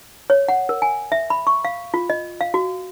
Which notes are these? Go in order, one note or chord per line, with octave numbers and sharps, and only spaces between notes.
C#5
F#5
A#4
G#5
E5
B5
C#6
F5
F4
D#5
F5
F#4